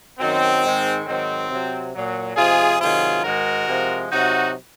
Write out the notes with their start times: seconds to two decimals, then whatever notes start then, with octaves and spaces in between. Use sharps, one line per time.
0.19 F#2 D#3 F#3 C4
0.63 G#2 D#3 G#3
1.06 G#2 D#3 F#3 C4
1.50 C3 F#3
1.93 A#2 F#3
2.36 C3 F3 G#3 F4 G#4
2.80 C3 D#3 F#3 F4 G#4
3.24 G#2 D#3 G#3 F#4 A#4
3.67 C3 F3 G#3
4.11 C3 F#3 D#4 F#4